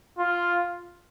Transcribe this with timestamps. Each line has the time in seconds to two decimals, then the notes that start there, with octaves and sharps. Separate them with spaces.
0.18 F4